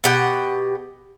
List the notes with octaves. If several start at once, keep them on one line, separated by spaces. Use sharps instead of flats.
B2 G4 F#5